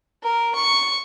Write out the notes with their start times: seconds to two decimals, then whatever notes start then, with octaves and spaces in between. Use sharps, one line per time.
0.23 A#4
0.55 C#6